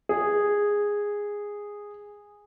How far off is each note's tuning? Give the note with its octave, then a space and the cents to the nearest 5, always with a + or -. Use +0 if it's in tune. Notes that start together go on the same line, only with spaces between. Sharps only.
G#4 -10